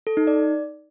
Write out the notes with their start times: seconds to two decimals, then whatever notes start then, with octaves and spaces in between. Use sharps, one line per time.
0.07 A4
0.17 D#4
0.27 D5